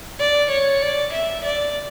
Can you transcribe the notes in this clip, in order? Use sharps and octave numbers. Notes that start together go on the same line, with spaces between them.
D5
C#5
D5
E5
D5